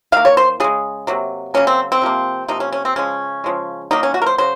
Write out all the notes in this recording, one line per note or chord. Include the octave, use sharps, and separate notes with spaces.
D#3 A#3 F5
C#5
C5
C#3 G#3 G#4
C3 F#3 A#3
C#3 F#3 A#3 C#4
C4
C4
C3 F3 A#3
C3 F3 A#3 D#4
C#4
C#4
C4
C#3 F3 G#3 C#4
C#3 F3 G#3
D#3 F#3 A#3 D#4
C#4
F#4
A#4
C5
C#3 F#3 C5